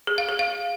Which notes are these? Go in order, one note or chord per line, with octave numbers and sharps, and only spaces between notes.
G#4
F5
G#4
F5